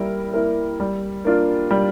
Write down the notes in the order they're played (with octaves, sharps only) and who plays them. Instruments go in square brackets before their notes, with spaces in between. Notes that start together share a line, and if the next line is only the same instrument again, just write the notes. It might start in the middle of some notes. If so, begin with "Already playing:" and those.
Already playing: [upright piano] G3 A#3 E4 A#4
A#3 E4 A#4
G3
A#3 D4 F4
G3